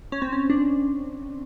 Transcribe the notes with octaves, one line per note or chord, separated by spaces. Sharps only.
C#4
C4
C#4
D4